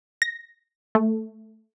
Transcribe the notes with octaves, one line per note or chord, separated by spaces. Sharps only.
A#6
A3